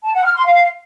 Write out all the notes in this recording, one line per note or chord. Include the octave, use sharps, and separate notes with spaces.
A5
F#5
F6
C6
F5